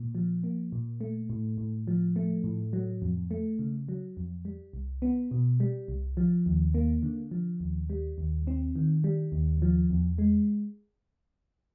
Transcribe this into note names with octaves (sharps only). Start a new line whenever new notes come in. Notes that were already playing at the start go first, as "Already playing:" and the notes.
Already playing: A#2
F3
A#3
A#2
A3
A2
A2
F3
A3
A2
F#3
F2
A3
C#3
F#3
F2
G3
C2
B3
B2
G3
C2
F3
D#2
A#3
D3
F3
D#2
G3
D#2
C4
D#3
G3
D#2
F3
E2
G#3